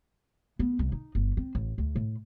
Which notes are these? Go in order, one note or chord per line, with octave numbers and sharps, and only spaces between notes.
B3
C2
D#4
G1
C4
A1
D2
A2